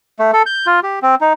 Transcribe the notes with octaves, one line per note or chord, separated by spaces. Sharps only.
A3
A4
G6
F4
G4
C4
D#4